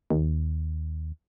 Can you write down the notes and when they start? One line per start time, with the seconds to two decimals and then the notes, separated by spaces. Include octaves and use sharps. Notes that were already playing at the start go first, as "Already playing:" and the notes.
0.10 D#2